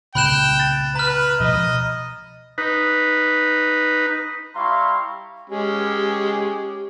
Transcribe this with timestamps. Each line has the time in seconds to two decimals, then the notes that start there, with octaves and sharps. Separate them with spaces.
0.15 C2 A#2 C#3 G5 B5 F#6 E7
0.60 A6
0.95 B4 A#5 F6
1.40 C#2 B2 F3 D#5
2.58 D#4 B4
4.56 G3 E4 F5 A#5 C6 C#6
5.49 G#3 C#4 G4